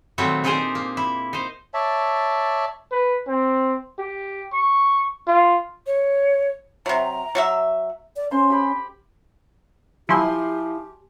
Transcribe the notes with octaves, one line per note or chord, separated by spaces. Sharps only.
A#2 D#3 F#3 G3 A3 C4
D4 D#4 G4 G#4 A#4 C5
A#3
E4
D#4 C5
C#5 D5 E5 A5
B4
C4
G4
C#6
F4
C#5
C3 F#3 A#5
F#3 F#4 E5
D5
C#4 C5 C6
G4 B5
F3 E4 G4 G#5 C6